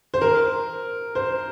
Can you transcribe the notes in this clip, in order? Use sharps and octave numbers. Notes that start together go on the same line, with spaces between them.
C5
A#4
C5